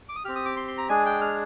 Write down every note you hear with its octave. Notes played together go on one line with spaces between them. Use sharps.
D6
D#6
C4 G4 F6
D#6
D6
C6
C6
A#5
G#3 D4 G#4 G#5
G5
F6